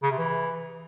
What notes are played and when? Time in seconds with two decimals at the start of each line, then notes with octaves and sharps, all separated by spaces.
0.03 C#3
0.11 C3
0.19 E3